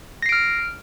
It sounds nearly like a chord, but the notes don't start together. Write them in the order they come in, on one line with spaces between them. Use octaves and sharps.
A#6 C7 D7 F6